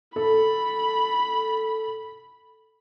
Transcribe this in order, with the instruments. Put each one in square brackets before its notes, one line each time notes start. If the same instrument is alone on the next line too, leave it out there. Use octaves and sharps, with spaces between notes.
[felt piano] A4 [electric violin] B5